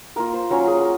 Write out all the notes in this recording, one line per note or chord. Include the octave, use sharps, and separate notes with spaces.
A#3 F4 A#4
C5
F#3 C#4 F4 A#4
G#4
A#4